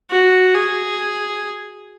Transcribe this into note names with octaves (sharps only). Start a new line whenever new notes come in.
F#4
G#4